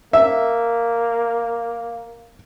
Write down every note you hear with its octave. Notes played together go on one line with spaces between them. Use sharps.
A#3 E5